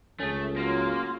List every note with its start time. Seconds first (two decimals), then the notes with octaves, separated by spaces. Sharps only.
0.20 C#2 A3 C#4 G#4
0.56 F#3 A#3 F4